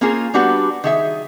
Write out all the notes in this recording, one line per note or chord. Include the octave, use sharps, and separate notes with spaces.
A#3 C4 C#4 F4 G#4 A#4
G3 B3 D4 F#4 G4 B4
D#3 G#4 E5